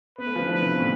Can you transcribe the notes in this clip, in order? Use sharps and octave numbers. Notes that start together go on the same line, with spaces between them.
B3 B4
A3
F3
D3
E3
D3 B4
C3
B2
A2